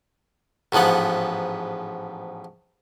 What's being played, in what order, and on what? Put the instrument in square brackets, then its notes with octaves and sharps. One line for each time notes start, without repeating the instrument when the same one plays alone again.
[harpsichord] A1 G#2 F3 B3 F#5